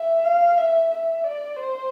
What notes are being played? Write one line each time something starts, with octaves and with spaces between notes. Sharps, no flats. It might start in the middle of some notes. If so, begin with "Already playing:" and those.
Already playing: E5
F5
E5
E5
D5
C5